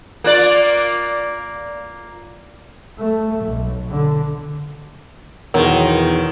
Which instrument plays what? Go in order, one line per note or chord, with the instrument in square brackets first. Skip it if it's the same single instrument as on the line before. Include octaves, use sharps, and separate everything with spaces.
[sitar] A#3 F4 D5
[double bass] A3
B1
D3
[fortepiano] B1 [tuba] E2 [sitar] D#3 [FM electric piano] A#4 C#5